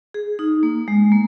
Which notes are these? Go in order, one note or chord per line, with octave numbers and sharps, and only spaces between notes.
G#4
D#4
A#3
G#3
A#3